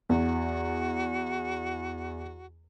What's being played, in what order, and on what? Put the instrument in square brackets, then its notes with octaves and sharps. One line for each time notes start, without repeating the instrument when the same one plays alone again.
[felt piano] E2 [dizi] F#4